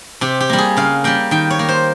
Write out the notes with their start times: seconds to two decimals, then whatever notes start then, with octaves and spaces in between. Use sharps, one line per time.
0.21 C3 G4
0.40 G4
0.49 G3 A#3
0.58 G#4
0.77 C#3 F5
1.04 G3 A#3 G5
1.31 D#3 G5
1.50 C#5
1.59 A#3
1.69 C5